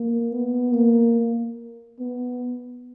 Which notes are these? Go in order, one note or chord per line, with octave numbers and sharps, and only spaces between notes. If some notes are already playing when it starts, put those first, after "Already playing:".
Already playing: A#3
B3
A#3
B3